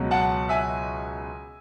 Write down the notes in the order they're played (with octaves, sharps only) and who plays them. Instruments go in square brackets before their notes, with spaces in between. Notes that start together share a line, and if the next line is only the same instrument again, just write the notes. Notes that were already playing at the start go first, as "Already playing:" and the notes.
Already playing: [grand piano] C#2 B2 F#3
F#5 A5
E5 G#5